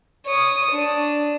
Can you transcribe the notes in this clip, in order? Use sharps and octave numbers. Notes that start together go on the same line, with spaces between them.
C#5 D#6
D4